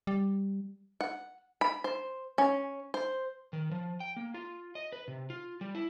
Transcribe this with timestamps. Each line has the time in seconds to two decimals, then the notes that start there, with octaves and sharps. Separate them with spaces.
0.07 G3
1.01 F#5
1.61 B5
1.84 C5
2.38 C#4
2.94 C5
3.53 D#3
3.71 F3
4.00 G5
4.17 A#3
4.34 F4
4.75 D#5
4.93 B4
5.08 C3
5.30 F4
5.61 G3
5.75 E4